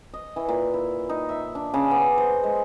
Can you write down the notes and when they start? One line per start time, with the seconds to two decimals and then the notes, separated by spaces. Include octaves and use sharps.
0.14 D#5
0.36 E3
0.48 A#2
0.74 E4
1.09 D#4
1.29 E5
1.55 D4
1.74 C#3
1.91 B3
2.18 C5
2.43 G#3